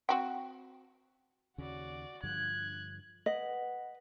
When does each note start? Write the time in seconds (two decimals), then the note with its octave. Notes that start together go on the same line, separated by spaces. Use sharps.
0.09 C4 F#4 G5
1.58 D#2 C#3 C#4 F#4 D5
2.23 G2 D3 F3 F#6 G#6
3.26 B4 D#5 F#5